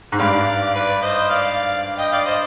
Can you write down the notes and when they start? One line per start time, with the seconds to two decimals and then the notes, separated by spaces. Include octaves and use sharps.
0.12 G#2
0.19 G2 D5 F5
0.75 B4 D5
1.02 C5 D#5
1.30 D5 F5
1.98 D#5 G5
2.12 D5 F5
2.26 C5 D#5